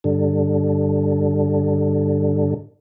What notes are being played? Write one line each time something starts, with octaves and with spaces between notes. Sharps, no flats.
G2 D3